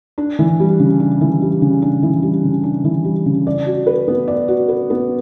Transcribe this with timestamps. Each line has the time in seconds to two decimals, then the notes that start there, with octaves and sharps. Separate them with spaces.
0.18 D4
0.39 E3
0.60 G3
0.79 C#3
1.00 D4
1.21 E3
1.42 G3
1.62 C#3
1.82 D4
2.03 E3
2.23 G3
2.44 C#3
2.64 D4
2.84 E3
3.05 G3
3.26 C#3
3.47 D5
3.66 F#4
3.87 B4
4.08 B3
4.28 D5
4.48 F#4
4.68 B4
4.90 B3